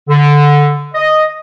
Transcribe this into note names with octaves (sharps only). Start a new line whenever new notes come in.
D3
D#5